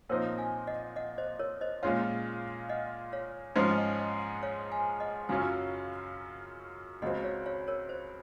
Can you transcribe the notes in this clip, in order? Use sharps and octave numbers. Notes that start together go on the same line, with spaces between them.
A#2 F3 C4 D#4 A#4 C#5
F5 G#5
D#5 F#5
D#5 F#5
C5 D#5
A#4 C#5
C5 D#5
A#2 G#3 C#4 F4 C#5 F5
D#5 F#5
C#5 F5
G#2 F3 G#3 C#4 D#5 F#5
D#5 F#5
D#5 F#5
C#5 F5
F5 G#5
D#5 F#5
F#2 C#3 F#3 C#4 F4 F5 G#5
C#2 C#3 F#3 C4 D#5 F#5
C#5 F5
C#5 F5
A#4 C#5
C5